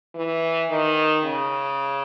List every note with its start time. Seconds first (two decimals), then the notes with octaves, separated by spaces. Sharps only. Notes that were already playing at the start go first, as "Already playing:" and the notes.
0.15 E3
0.70 D#3
1.24 C#3